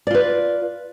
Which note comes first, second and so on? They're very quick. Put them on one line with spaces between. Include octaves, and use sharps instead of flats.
D5 F4 B4